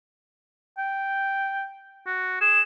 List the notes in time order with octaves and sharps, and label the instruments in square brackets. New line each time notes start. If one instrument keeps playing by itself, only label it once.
[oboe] G5
F#4
[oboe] G#4 [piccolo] E7